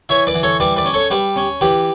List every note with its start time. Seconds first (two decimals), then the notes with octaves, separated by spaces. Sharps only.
0.09 E3 C#5 E5
0.27 B4 D5
0.35 E3
0.43 A4 C#5
0.60 G3 B4 D5
0.76 B4 D5
0.85 C#4
0.94 A4 C#5
1.10 G3 G4 B4
1.36 C#4
1.61 E3 G4 B4